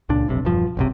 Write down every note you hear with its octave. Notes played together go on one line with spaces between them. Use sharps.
C#2 A#2 D4
F1 B1 C3
E1 G2 F3
F#1 B1 C3